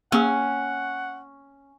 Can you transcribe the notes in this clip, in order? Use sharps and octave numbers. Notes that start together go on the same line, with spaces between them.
A#3 C#4 G#4 F#5